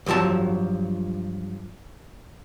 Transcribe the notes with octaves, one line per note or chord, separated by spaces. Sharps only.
D2 G2 F3 F#3 A5